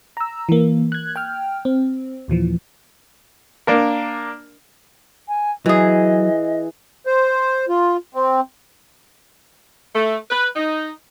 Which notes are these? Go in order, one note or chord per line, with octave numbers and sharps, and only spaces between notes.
A#5 E6
E3 A#3
F#6 G#6
G5 F6
C4
D#2 A#2 E3 F3
A#3 D4 A#4
G#5
E3 F#3 G#4 D#5
C5
F4
C4
A3
B4
D#4